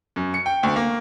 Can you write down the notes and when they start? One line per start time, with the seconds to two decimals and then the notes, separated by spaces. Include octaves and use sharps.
0.16 F#2
0.34 C#7
0.46 G5
0.63 D2
0.76 A#3